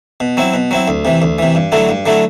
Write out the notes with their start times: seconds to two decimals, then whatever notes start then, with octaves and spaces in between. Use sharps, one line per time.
0.20 B2
0.37 F#3 C4 E4
0.54 B2
0.71 F#3 C4 E4
0.88 D2
1.05 C3 E3
1.22 D2
1.39 C3 E3
1.55 G2
1.72 D3 F#3 A3 E4
1.89 G2
2.06 D3 F#3 A3 E4